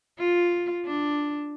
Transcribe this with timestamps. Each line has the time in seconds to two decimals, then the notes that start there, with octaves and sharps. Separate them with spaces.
0.19 F4
0.86 D4